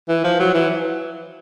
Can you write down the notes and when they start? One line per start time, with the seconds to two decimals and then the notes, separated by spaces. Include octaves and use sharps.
0.09 E3
0.24 F3
0.39 F#3
0.54 E3